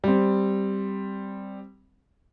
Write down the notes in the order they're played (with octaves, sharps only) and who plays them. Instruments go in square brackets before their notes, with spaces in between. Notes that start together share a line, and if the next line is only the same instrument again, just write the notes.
[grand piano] G3 C4